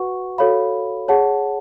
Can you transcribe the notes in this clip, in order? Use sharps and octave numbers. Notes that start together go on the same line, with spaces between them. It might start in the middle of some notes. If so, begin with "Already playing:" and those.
Already playing: F#4 B4 F#5 C#6
F#4 A4 C#5 F5 B5
G#4 C#5 F#5 A5